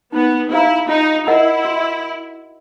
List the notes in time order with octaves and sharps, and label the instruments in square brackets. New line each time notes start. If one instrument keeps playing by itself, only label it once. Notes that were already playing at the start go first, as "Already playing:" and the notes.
[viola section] B3 [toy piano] D#4
[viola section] E4 [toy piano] G4 C5 F5 A#5
[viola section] D#4 [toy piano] F4
[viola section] E4 [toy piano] A#4 D#5 F#5 A5
[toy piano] F#4